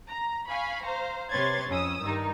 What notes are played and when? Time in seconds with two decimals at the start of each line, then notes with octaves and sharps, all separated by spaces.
0.11 A#5
0.48 F5 G#5 B5 C#6
0.86 C5 F5 A#5
1.29 C3 B4 C#5 C6 G#6 A6
1.69 F2 C#4 D#6 E6
2.02 G2 D#3 D#4